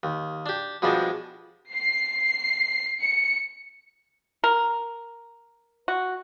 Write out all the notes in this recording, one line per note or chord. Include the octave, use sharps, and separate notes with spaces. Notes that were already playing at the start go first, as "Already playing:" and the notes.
D#2
D4 G4
B2 F3 G3 G#3 D4
C7
C#7
A#4
F#4